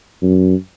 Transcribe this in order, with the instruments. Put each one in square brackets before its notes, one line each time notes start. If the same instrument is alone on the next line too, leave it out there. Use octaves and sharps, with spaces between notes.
[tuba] F#2